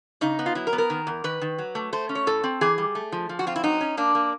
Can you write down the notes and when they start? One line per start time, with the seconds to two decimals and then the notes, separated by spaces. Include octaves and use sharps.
0.21 C#3 D#4
0.39 B3
0.46 F4
0.55 F#3 E4
0.67 A#4
0.73 B3
0.78 A#4
0.90 D#3
1.07 E2
1.24 D#3 B4
1.41 D#3
1.58 F#3
1.75 A3
1.93 A3 C5
2.09 C#4
2.15 C#5
2.27 A2 A4
2.44 C4
2.61 E3 G#4
2.78 G3
2.95 A3
3.12 F3
3.29 F3
3.39 F#4
3.47 C4 F4
3.56 E4
3.63 F#3 D#4
3.81 C#4
3.97 A#3 D4
4.15 A#3